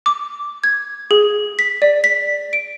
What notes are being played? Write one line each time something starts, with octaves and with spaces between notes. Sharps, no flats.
D6
G#6
G#4
B6
D5
B6
D7